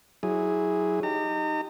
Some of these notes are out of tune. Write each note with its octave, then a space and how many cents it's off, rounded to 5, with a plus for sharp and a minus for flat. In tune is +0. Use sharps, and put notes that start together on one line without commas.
F#3 +0 E4 -20 G#4 -5
D#4 +0 G4 +0 A#5 -40